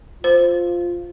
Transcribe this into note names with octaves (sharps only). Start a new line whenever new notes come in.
F4 C5